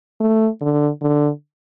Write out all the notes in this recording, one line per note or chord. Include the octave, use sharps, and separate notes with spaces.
A3
D3
D3